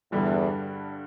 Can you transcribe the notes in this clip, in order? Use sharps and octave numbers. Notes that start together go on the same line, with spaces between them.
E2 G2 D3 G3